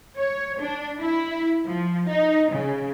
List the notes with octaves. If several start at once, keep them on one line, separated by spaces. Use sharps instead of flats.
C#5
D4
E4
F3
D#4
C#3